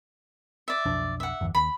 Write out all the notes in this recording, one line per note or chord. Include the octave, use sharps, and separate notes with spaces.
D5 E5
B1 F2 D4
E5 F#5
G1 E2
D#2 B5